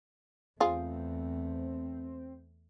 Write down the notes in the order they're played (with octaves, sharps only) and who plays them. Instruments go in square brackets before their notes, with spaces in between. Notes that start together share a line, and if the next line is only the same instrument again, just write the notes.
[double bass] E2 A3 [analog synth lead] C4 [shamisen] F4 G#4